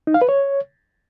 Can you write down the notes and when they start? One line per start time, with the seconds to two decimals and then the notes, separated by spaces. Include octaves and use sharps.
0.07 D#4
0.14 F5
0.21 B4
0.29 C#5